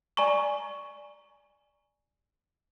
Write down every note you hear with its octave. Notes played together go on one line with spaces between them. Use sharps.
D5 G#5 A#5 C#6